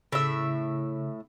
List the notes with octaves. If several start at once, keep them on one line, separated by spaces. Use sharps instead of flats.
A2 C#3 E5 B5